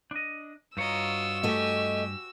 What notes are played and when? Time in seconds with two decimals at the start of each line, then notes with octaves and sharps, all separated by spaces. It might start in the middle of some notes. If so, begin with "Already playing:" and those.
0.11 D4 D#5
0.77 G2 F4 F#4 C#5 D#5 A#5 E6
1.43 A3 G4 D#5 G#5